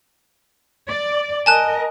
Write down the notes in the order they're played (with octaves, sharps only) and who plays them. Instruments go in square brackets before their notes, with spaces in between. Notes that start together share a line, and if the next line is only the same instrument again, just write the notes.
[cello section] D5
[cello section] A#4 D#5 [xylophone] G#5 A5 F#6